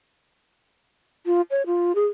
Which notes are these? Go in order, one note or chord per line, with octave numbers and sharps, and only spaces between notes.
F4
C#5
F4
G#4